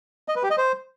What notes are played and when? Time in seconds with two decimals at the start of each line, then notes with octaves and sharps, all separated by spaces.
0.28 D#5
0.36 B4
0.43 G4
0.50 D#5
0.58 C5